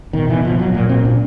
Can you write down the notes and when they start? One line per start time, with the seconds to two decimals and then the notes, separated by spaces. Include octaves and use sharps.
0.13 B2 D#3
0.28 B2 E3
0.44 B2 F3
0.59 B2 F#3
0.74 A#2 F#3
0.89 A#2 C4
1.05 A#2 D4